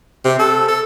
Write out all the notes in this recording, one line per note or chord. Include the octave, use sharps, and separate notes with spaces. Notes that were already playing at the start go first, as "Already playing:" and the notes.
C3
A4
A4